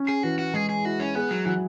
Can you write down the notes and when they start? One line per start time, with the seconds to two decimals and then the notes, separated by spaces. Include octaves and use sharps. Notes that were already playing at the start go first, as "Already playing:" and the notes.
Already playing: C#4
0.09 G#4
0.23 E3 F#4
0.39 F#4
0.54 G#3 G#4
0.69 G#4
0.85 E4 F#4
1.00 C#4
1.15 B3 G#4
1.31 F#3
1.45 E3 F#3